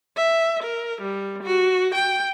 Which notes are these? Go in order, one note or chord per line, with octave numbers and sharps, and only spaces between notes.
E5
A#4
G3
F#4
G5